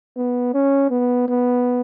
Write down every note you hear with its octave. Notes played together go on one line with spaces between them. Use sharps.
B3
C#4
B3
B3